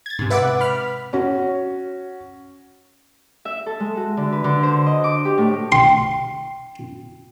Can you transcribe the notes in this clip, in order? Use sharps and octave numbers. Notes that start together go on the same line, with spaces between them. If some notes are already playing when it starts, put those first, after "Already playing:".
G#6 A6
G#2 C3
B4 E5 F#5 D6
B5 F6
C#4 F#4
E5
A4
G#3
F#4
D3
B4
D3
C5
D#5
D6
G4
A2
G5 C6